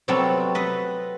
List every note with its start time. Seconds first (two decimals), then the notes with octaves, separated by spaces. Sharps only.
0.08 C3 F#3 G3 B3 C4 A4
0.55 A4 B4 D#5